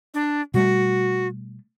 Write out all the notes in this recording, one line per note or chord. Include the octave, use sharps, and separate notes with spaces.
D4
B2 G3 A3 F#4